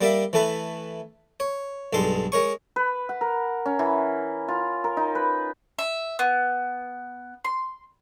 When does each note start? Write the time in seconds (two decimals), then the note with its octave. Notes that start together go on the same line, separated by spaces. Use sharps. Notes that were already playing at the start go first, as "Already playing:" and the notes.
0.01 G3 A#3 D5 E5
0.33 E3 A3 A4 B4
1.40 C#5
1.93 B1 G2 G#3 A4 C6
2.32 G#3 A#4 C#5 C#6
2.76 B4
3.09 F#5
3.21 A#4
3.66 C#4
3.79 E3
4.48 F4
4.84 A#4
4.97 D#4
5.15 B4
5.79 E5
6.19 B3
7.44 C6